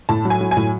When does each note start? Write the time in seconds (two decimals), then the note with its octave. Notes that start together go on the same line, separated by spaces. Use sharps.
0.09 A2 A5
0.25 F#3
0.30 G#5
0.41 F#3
0.51 G#5
0.57 A2